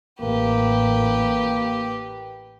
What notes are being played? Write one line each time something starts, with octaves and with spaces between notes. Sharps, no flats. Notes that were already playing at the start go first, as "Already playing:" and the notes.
A1 A#3 G4 B4